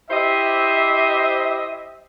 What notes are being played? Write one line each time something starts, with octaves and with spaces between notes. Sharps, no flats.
E4 G4 C5 D#5 E5